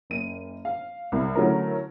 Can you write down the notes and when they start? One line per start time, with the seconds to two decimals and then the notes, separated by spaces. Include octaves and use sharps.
0.10 F#1 D#7
0.65 F5
1.12 C2
1.35 D3 F#3 A3 C#4 E4 A#4